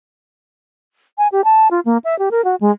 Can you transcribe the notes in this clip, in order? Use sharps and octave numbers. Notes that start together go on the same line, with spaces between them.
G#5
G4
A5
F4
A#3
E5
G4
A#4
F#4
G#3